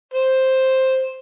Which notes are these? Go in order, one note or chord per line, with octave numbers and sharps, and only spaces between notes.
C5